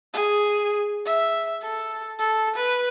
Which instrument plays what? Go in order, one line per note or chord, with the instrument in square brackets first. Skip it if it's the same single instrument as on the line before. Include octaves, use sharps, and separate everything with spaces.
[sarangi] G#4
E5
A4
A4
B4